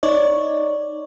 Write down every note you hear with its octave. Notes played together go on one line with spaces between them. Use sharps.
D#4 C#5 D5